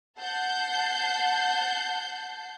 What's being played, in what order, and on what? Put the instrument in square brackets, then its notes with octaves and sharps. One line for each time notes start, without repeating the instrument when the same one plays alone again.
[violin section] F#5 A5 G6 C7